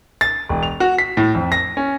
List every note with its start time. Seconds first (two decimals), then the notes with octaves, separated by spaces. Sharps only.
0.21 A6
0.49 E1
0.63 F7
0.80 F#4
0.98 B6
1.17 A2
1.35 F2
1.52 A#6
1.77 C#4